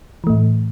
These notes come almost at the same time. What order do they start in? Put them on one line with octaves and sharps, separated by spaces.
E3 A3 A2